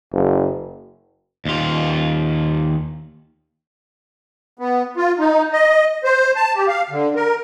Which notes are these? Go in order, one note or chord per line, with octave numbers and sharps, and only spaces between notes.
F#1
D#2 F4
B3
F4
D#4
D#5
C5
A5
G4
F5
D3
A#4